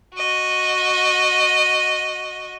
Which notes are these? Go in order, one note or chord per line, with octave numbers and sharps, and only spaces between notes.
F#4 D#5